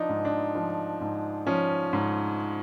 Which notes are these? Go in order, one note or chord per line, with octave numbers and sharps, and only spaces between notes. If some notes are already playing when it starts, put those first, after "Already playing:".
Already playing: F3 D4 D#4
G#2
D4
F3
G#2
F3 C#4
G#2